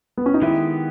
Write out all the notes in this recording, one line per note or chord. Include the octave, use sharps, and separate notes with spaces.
B3
C#4
D#4
D#3 G#3 B3 E4 G4